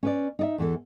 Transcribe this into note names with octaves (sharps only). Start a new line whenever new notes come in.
C#4 B4 D5
D#4 D5 E5
E2 E3 A4